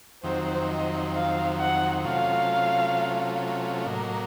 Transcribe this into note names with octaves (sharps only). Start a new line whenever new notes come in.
F2 D#3 F#3 C4 C5
D#5
F5
F#5
C3 F#3 A3 C#4 F4 F5
A2 F#3 A#3 D#5